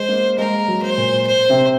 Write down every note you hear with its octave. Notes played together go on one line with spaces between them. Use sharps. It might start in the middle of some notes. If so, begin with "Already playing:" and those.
Already playing: G#3 C5
A#3
G#3 A#4
F#3
C5
A#2
C5
C3